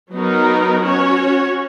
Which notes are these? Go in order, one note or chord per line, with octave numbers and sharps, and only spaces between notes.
F#3 B3 D#4 A#4
C#4 F#4 C#5